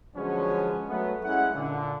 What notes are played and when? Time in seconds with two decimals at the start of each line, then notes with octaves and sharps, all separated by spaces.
0.16 D3 F3 F#3 G#3 B3 C#4
0.89 F#3 A3 B3
1.25 G#3 C#4 E4 F#5
1.54 A#2 D3